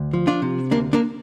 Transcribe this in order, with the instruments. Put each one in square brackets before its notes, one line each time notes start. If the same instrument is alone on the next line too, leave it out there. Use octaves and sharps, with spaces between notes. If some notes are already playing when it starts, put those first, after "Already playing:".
Already playing: [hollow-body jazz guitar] D2
F3
D4 F4
C3
D2 A#3 D4
A#3 D4